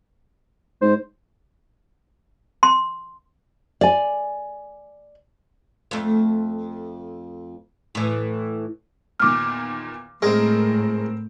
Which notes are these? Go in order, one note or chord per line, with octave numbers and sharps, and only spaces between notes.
G#2 C5
C6
D5 G#5
F2 A3
A2 E3
E2 A#2 D#3 D6 F6
A2 G#3 C4 A#4